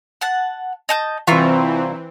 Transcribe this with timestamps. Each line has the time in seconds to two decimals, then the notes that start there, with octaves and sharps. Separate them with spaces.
0.21 F#5 A5
0.89 D#5 A5 G6
1.27 C2 E3 C4 F4 E5 A#5 C#6